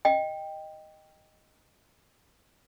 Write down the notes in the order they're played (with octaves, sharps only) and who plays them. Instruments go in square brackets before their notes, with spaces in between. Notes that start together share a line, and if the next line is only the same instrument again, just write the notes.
[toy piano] D#5 G5